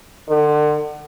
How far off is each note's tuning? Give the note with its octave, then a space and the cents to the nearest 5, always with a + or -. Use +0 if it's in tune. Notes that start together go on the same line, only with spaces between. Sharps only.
D3 +35